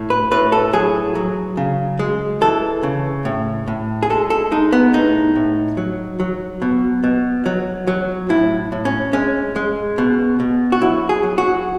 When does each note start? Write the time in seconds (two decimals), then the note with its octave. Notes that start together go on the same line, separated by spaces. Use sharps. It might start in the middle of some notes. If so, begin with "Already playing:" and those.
Already playing: A2
0.10 B4
0.31 A2 B4
0.52 A4
0.73 F#3 G#4
1.15 F#3
1.57 C#3
1.99 G#3
2.41 E3 A4
2.83 C#3
3.25 A2
3.68 A2
4.03 G#4
4.10 G#3 A4
4.30 A4
4.51 G#3 D#4
4.72 B3
4.93 A2 D#4
5.36 A2
5.77 F#3
6.20 F#3
6.62 B2
7.04 B2
7.46 F#3
7.87 F#3
8.29 A2 E4
8.72 A2
8.85 C#4
9.13 G#3 C#4
9.56 G#3
9.98 B2
10.40 B2
10.72 F#4
10.81 F#3 E4
11.09 G#4
11.23 F#3
11.38 F#4